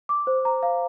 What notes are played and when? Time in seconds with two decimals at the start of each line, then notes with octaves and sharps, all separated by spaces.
0.09 D6
0.27 C5
0.45 A#5
0.63 F5